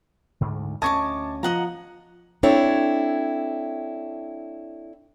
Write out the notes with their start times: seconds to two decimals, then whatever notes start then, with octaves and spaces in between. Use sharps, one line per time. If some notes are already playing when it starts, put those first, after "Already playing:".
0.41 D2 G#2 D3
0.82 D2 C#4 D#5 A5 C#6 D6 G#6
1.43 F3 D#5 F#5 A#5
2.43 C4 D4 E4 A4 C#5